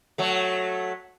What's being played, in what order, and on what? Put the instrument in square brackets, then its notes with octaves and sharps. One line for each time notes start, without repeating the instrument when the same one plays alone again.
[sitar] F#3 A3